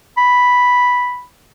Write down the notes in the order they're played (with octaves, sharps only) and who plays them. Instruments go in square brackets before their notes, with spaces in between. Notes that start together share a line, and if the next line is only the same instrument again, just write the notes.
[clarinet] B5